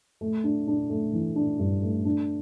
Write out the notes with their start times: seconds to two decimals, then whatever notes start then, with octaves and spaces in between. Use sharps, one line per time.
0.21 A3
0.44 D4
0.67 D4
0.90 A3
1.13 E3
1.36 D4
1.60 G2
1.82 A3
2.05 D4